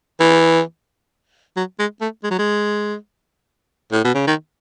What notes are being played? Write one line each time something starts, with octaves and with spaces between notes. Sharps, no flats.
E3
F#3
G#3
A3
G#3
F#3
G#3
A2
B2
C#3
D#3